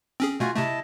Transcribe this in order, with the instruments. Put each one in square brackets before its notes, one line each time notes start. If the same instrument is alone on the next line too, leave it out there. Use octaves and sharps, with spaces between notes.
[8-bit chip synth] C4 C#4 G#4
[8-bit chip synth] B2 A3 [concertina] F4 F#4 G#5
[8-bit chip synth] C3 A3 [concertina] E4 D#5 A5